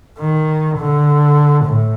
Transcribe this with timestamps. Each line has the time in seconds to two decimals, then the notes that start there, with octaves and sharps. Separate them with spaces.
0.19 D#3
0.78 D3
1.64 A2